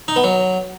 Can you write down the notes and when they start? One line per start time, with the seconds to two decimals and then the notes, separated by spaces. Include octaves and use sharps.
0.08 D#4
0.16 B3
0.24 F#3